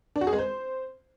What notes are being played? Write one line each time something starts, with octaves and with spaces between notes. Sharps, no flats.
D4
F#4
G#4
G#3
C5